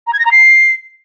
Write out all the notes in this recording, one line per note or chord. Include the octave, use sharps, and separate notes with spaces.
A#5
G#6
A#6
A#5
C7